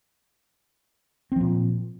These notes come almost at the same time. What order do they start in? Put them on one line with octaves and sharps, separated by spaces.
C4 F3 A#2